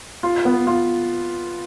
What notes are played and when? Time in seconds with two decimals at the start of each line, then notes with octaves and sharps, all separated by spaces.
0.23 F4
0.45 B3
0.67 F4